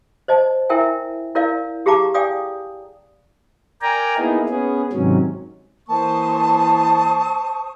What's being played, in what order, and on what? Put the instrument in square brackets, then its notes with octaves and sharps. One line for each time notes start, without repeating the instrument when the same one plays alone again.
[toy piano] C5 D#5 A5
E4 A#4 E5 G5 G#5
E4 A#4 D5 F5
G4 G#4 F5 A5 A#5 D6
D5 F5 G5 G#5 D#6
[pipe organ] A#4 D5 G5 G#5 A#5
A#3 B3 D#4 E4 G#4
B3 C#4 G#4
G#2 C3 D#3 F#3 C#4
[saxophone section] E3 A#3 [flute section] C5 C#6 D#6 [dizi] A5